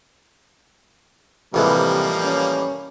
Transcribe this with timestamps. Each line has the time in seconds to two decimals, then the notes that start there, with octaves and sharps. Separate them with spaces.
1.54 A1 C3 E3 F3 G3 G#3 A#3
2.25 C#4